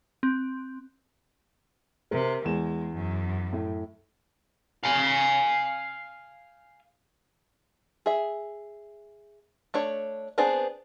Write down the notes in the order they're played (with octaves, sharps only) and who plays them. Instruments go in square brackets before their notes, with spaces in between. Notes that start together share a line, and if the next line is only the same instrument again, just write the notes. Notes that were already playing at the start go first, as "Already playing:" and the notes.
[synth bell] C4
[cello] C3 [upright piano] A#4
[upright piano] E2 E7 [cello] G#3
[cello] F#2
[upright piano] A2
[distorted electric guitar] F5 G#5
[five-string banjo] G#4 E5
A3 D4 C#5
B3 C4 D4 G#4 C5